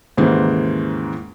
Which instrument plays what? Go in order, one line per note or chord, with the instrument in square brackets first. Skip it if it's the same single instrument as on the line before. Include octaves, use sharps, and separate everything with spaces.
[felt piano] D#2 G#2 C#3 E3 C5